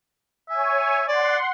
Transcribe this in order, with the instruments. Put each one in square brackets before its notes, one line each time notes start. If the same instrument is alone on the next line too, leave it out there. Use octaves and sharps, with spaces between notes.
[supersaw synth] C#5 G#5 [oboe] E5
[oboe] D5 [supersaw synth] F#5 C6